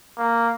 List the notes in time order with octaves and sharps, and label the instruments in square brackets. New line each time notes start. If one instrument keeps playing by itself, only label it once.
[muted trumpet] A#3